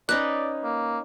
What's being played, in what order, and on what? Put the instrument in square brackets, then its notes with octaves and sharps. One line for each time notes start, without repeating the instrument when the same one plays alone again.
[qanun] C#4 D#4 B4 [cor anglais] D5 [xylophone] F#6
[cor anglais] A#3